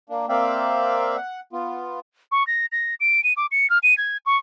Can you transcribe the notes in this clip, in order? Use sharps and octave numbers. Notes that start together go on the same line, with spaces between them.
A#3 D4
A#3 C4 D5 E5 F5 G5
F#5
B3 F4
C#6
A#6
A#6
D7
D#7
D6
C#7
F6
D#7
G#6
C#6